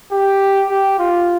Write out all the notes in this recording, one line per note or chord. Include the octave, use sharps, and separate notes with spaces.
G4
G4
F4